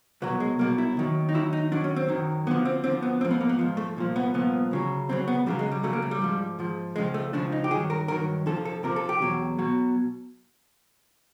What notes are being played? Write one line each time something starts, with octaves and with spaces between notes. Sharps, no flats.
C2 B2 F#3 B3
G#3
C2 B2 F#3 A#3
E4
D#2 D#3 F#3
D#4
D#2 D#3 F#3 E4
D#4
F#2 D#3 F#3 D4
C#4
C4
F#2 D#3 F#3
D2 D3 F3 B3
C4
D2 D3 F3 C4
B3
G#2 F3 C4
B3
A#3
B3
G#2 F3
A3
C2 A#2 F3
B3
C2 A#2 F3 B3
D2 C#3 F#3
D2 C#3 F#3 C4
B3
F2 C#3 F#3 G3
G#3
G3
F2 C#3 F#3 A3
A#3
A3
G3
G#2 F3
G#2 F3
C#2 C#3 F3 G#3
A3
C#2 C#3 F3 D4
D#4
G4
G2 D#3 F#3 G#4
A#4
G2 D#3 F#3 A#4
F2 C3 F3 A4
A4
F2 C3 F3 A#4
A4
G4
E2 B2 F#3
B2 F#3